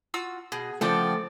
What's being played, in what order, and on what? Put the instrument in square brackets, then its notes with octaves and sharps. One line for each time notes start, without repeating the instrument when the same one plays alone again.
[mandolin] F4 F#4 E6
[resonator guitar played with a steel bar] B2 [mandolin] G#4
[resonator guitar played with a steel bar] C#3 F3 [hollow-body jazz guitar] A3 [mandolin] F4 F#5 G5 [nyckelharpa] D5